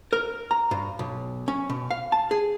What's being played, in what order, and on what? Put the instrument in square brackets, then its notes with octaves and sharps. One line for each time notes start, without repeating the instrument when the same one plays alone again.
[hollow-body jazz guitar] A#4
A#5
G2
B1
C#4
B2
F5
A5
G#4